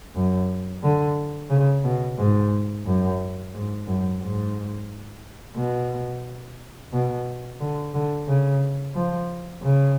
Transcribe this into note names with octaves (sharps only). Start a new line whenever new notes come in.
F#2
D3
C#3
B2
G#2
F#2
G#2
F#2
G#2
B2
B2
D3
D3
C#3
F3
C#3